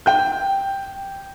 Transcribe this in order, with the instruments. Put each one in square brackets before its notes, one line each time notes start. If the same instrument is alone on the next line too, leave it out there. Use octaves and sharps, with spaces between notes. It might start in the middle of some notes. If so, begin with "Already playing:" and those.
[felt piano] G5 G6